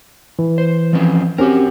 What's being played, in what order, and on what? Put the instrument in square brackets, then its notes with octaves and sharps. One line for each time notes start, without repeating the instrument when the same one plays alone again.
[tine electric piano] E3
[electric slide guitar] C5
F3 C4 C#4
[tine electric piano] C4 C#4 G4 [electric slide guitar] F#4 A#4